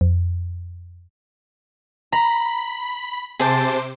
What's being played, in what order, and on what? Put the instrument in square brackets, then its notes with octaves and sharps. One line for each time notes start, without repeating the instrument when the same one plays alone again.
[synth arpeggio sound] F2
[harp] A#5 [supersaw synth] B5
[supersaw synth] C3 C5 D6 [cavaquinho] G#4 A5